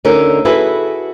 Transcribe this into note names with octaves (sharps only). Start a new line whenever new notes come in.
D2 D3 C#4 D#4 A#4
E4 F#4 G#4 A4 B4